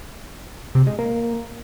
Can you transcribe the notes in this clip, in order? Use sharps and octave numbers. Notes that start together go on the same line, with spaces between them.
C3
G#3
A#3